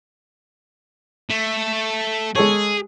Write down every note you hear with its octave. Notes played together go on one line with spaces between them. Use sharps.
A3
G#3 G#4 A4 C#5